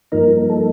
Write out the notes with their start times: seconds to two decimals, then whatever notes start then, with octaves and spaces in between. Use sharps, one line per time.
0.12 G2 F3 A#3 D#4 A#4
0.50 A4